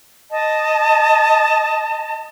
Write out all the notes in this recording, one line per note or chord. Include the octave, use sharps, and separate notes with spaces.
D#5 A5